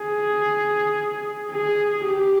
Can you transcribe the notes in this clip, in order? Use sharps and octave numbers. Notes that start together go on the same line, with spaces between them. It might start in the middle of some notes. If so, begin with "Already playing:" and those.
Already playing: G#4
G#4
G4